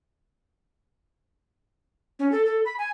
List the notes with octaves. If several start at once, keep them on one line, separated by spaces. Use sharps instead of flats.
C#4
A4
A4
B5
G#5